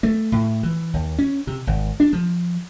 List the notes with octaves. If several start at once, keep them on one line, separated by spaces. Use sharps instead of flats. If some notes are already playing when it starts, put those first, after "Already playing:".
A3
A2
E3
D#2
C#4
C3
G#1
D4
F3